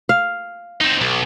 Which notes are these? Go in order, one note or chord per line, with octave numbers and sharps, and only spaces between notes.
F5
C4 D#4
B1